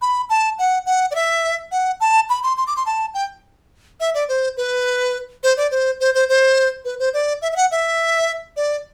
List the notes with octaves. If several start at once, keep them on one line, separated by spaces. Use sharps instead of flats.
B5
A5
F#5
F#5
D5
E5
F#5
A5
B5
C6
C6
D6
C6
A5
G5
E5
D5
C5
B4
C5
D5
C5
C5
C5
C5
B4
C5
D5
E5
E5
F#5
E5
D5